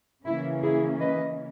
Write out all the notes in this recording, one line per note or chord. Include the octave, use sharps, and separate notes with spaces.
C#3 E3 A#3 C#4 E4
E4 G#4
B4 D#5